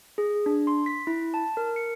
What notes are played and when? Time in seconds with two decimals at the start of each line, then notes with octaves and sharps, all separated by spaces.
0.18 G#4
0.46 D4
0.67 C6
0.86 B6
1.07 E4
1.34 A5
1.57 A#4
1.76 C#7